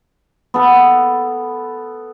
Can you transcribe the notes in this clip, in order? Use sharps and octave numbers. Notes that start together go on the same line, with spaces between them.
B3 A4